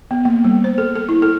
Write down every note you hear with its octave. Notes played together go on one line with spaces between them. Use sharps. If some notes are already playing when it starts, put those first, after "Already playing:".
B3
A#3
G3
C5
A4
A4
E4
A4